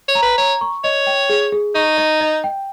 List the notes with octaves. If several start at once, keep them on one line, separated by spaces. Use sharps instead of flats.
C#5
A#5
B4
C#5 A#5
C#6
C#5 D#5
G5
G#4
G#4
D#4 C#6
D#5
D#5
G5